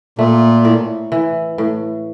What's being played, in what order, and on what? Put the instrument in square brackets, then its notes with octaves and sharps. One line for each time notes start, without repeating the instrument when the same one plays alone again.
[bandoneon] A#2 [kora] A3
[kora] A2
E3
A2